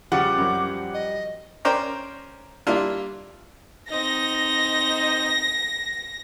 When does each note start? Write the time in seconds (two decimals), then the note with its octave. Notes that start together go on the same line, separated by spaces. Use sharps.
0.12 C#3 F3 G3 F#4 F#5 D6
0.38 F#2 F#3
0.94 D#5
1.65 C#4 A#4 C5 D5 G5 A#5
2.67 G3 A#3 D4 E4 F4
3.91 C4 D#4 A#6